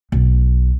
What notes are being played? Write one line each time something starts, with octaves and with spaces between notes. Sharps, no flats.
B1